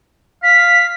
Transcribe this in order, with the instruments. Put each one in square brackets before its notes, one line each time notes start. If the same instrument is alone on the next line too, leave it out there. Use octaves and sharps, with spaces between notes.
[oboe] F5 [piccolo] B6